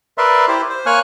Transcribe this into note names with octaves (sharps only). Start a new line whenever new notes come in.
A#4 B4 D5 E5 C6
E4 G4 C5
C5
A#3 C#5 G#5 C#6 F6 F#6